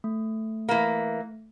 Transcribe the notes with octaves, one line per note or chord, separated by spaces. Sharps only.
A3
E3 A#3